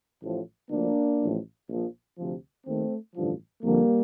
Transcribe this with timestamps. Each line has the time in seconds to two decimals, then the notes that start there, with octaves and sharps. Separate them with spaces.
0.23 A1 A2 F3
0.71 D2 D3 F3 A#3 D4
1.20 A1 A2 F3
1.69 A#1 A#2 F3
2.17 D2 C3 F3
2.66 D#2 D#3 A3 C4
3.15 A1 G2 D3 F3
3.63 F2 D3 F3 G3 A#3